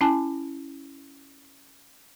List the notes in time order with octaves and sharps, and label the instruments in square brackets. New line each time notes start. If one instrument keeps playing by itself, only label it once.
[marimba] C#4 E4 G#5 A5